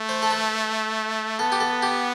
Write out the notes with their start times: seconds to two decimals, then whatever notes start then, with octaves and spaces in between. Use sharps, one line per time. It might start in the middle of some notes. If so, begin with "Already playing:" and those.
Already playing: A3
0.09 C5
0.22 A4
0.31 B4
1.39 B3 A4
1.52 G4
1.60 A4
1.82 G4